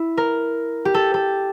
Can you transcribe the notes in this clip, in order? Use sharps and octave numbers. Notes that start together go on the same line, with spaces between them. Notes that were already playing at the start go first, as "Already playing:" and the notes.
Already playing: E4
A#4
G4
A4
A4